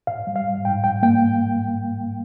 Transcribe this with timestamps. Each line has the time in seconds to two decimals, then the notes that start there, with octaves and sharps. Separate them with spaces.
0.07 G#2 F5
0.27 G3
0.36 F5
0.46 G#2
0.65 G#2 G5
0.84 G#2 G5
1.03 A#3 G5